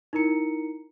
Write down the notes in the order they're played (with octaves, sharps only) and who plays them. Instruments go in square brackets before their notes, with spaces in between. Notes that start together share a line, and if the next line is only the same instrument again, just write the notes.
[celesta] D#4 E4 A#4 A#5 C#7